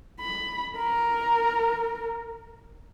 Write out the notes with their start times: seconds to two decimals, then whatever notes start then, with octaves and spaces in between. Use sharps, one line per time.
0.20 B5
0.78 A#4